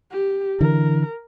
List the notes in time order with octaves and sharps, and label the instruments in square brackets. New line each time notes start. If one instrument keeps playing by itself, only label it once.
[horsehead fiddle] G4
[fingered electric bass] D3 E3 [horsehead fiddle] A#4